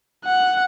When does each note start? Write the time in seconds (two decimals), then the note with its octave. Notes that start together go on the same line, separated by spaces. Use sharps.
0.25 F#5